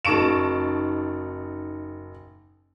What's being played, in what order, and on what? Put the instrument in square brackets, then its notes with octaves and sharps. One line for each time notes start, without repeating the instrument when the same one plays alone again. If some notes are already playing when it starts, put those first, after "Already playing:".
[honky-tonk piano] F#1 D#4 A5 C#6 D7 E7